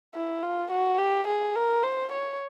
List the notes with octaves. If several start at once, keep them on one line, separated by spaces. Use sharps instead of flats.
E4
F4
F#4
G4
G#4
A#4
C5
C#5